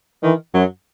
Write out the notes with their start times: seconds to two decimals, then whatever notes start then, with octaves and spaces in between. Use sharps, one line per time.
0.23 D#3 E3
0.54 F#2 F#3